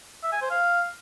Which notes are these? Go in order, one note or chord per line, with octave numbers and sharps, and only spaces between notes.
E5
G#5
C5
F5